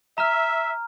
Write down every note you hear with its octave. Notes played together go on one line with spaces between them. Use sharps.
E5 A#5 F6